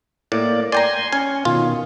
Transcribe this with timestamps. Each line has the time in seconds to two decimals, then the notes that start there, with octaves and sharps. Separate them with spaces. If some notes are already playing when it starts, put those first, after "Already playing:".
0.32 A2 A#3 D5
0.72 D5 G5 G#5 A#5 C6
1.13 C#4 G#5
1.45 B2 D#3 F4